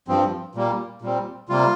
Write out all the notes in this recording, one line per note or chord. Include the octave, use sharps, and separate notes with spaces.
G2 F3 C4
A#2 G3 A#3
A#2 G3 C4
C3 G3 A#3 F4